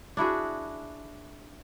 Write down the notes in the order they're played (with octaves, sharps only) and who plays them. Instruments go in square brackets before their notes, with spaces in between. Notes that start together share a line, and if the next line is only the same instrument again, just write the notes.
[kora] D4 E4 F#4 G#4